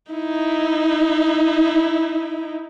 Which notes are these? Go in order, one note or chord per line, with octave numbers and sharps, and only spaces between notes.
D#4 E4